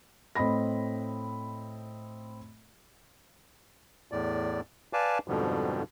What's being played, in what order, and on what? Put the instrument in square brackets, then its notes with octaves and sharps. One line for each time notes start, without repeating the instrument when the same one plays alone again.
[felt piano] A2 C4 D#5 B5 A#6
[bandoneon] E2 A2 D5
B4 D5 F5 G#5 A5 D6
F2 G#2 B2 D3 F3 G3